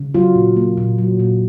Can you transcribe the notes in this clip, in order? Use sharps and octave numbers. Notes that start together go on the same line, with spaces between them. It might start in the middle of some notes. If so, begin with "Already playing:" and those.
Already playing: C#3
F#3 F4
A#2
A#3
A#2
F#3
A#2